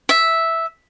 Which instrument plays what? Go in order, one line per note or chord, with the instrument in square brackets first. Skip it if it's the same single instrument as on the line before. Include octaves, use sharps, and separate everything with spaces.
[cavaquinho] E5